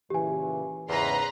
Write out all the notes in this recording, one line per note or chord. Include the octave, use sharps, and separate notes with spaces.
A#2 C#3 E3 G4 G#5
E2 G#2 C#3 B4 A#5 C6